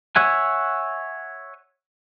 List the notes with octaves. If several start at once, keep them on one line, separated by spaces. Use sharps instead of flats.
C#5 E5 F#5 G#5